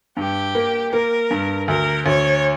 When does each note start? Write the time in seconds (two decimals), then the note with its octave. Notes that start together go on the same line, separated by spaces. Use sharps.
0.17 G2 G4
0.55 A#3
0.92 A#3 A#4
1.31 G2
1.68 D2 A#4
2.06 D2 C#5